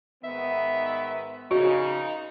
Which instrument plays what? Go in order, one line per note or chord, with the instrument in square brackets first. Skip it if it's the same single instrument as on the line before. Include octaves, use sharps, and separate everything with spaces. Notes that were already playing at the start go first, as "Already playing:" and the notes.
[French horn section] G#2 D#3 B3 [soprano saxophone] E5
[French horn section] F2 A#2 C#3 [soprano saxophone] D#4 [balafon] F#4